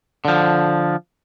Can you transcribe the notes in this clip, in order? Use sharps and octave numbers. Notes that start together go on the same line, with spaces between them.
D3 F3